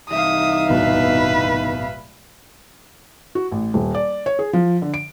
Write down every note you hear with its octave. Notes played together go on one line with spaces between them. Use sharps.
C2 E3 D#4 E5 F5 D#6
D1 G1 B2 B4
F#4
A1
D#1
D5
C#5
G#4
F3
D3
D7